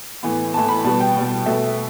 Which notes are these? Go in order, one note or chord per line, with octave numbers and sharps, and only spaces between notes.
A2 E3 B3
A2 E3 B3 A5
B5
B2 G3 B3 A5
G5
B2 G3 B3
B2 A3 E5